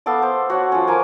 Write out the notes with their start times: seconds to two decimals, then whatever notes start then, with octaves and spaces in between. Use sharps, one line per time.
0.06 B3 A4 F5 D6
0.22 C5
0.50 F#4 C#5 F#5
0.72 F3 C#4
0.87 F3 A#4 G#5 D6